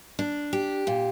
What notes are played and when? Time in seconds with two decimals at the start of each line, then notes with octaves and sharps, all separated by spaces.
0.19 D4
0.53 G4
0.87 A#2